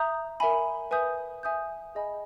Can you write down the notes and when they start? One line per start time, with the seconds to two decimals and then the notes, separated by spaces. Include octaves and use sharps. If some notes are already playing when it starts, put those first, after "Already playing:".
Already playing: E5 A#5 D#6 G6
0.40 A#4 E5 G#5 B5
0.91 B4 E5 G#5 D#6 G6
1.43 E5 G#5 D#6 G6
1.95 G#4 D#5 G#5 B5